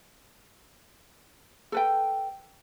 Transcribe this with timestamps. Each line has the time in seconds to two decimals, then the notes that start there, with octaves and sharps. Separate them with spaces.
1.72 A4 B4 G5